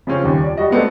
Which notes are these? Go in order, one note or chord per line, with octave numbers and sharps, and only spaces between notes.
C#3 F3 C4 C#4
D#1 D#2
F2 D5
G3 F#4 D#5
G#3 A3 B3 C4 D4 A4